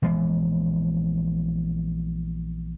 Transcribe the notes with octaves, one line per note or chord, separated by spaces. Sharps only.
A#1 E3 G#3 B3